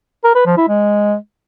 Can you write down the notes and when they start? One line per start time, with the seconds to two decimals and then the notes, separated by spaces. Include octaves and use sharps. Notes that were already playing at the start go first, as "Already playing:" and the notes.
0.24 A#4
0.35 B4
0.46 F3
0.57 E4
0.68 G#3